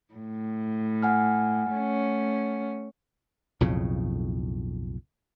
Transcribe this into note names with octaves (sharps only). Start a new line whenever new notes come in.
A2
F#5 G#5 F6
A3 C#4
B1 F2 A2 C#3